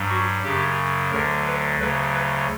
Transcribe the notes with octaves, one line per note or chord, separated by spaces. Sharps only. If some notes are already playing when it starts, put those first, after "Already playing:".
Already playing: G2 F#3
F#4
F#2 C#3 F#3 G4
D2 D3 F#3 A#4
B4
D2 C#3 F#3 B4
B4